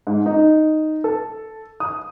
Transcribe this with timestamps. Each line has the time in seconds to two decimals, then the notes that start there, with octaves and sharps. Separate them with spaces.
0.07 G#2
0.26 D#4
1.04 A4
1.80 D#6